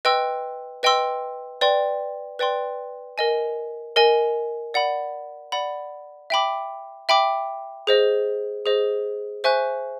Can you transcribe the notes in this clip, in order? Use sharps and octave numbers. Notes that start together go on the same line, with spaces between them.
B4 D#5 G5 C6 E6
B4 D#5 G5 C6 E6
B4 D5 G5 C6
B4 D5 G5 C6
A#4 D#5 G#5
A#4 D#5 G#5
D5 F#5 B5
D5 F#5 B5
E5 G5 B5 D6
E5 G5 B5 D6
G#4 C5 D#5
G#4 C5 D#5
C5 E5 G#5 C#6 F#6